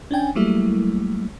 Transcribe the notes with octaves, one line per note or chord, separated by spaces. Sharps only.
C#4 D4 G5 G#5
F#3 G3 A3 A#3 E4